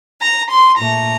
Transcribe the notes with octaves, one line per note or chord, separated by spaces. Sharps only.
A#5
C6
A#2 A3 A#5